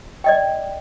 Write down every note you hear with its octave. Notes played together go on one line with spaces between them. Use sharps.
D5 D#5 G5